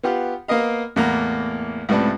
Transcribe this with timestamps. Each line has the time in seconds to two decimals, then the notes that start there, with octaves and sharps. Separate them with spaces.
0.03 B3 F4 G4 F#5
0.48 A#3 B3 A#4 D#5 F5
0.96 E2 A2 A#3 F#5 A#5
1.89 C#2 A2 C3 B4 D5 A5